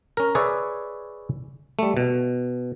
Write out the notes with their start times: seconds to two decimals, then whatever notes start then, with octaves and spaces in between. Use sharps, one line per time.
0.17 C#4 A#4
0.35 G#4 B4 C#5 D5 E5
1.79 G3 A3
1.97 B2